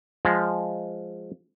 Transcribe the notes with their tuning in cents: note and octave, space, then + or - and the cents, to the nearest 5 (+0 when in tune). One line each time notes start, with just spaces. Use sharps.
F3 +0 G#3 -10